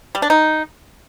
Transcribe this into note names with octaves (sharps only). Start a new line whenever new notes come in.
G3
D4
D#4